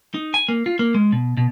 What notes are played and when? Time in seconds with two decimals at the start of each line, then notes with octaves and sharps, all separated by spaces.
0.14 D#4
0.34 G#5
0.49 A#3
0.66 F4
0.79 A#3
0.95 G#3
1.12 B2
1.37 B2